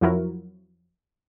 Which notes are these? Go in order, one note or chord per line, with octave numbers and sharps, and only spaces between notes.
F2 F3 F#3 E4 F#4 A#4